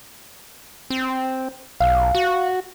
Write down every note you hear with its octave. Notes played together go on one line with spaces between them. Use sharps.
C4
B1 F5
F#4